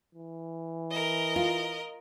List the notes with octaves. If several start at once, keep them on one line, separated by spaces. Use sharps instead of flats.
E3
A#4 D#5
F4